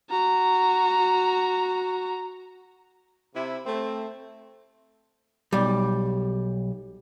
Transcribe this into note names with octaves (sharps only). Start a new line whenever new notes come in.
F#4 A#5
C3 E4
A3 C4
B1 G3